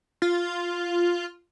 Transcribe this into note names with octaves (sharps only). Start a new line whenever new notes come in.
F4